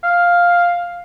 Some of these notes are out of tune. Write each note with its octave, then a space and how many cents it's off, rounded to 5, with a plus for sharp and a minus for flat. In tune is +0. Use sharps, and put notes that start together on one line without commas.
F5 +5